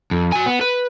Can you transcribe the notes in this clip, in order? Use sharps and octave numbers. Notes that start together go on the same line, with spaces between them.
F2
F#4 G#5
B3
B4